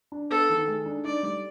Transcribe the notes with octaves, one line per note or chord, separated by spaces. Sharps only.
D4
B3 A4
D#3
G#3
D4
D#4 D5
G3